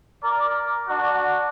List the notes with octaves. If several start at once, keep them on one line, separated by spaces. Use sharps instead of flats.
A#4 D5
D4 F#4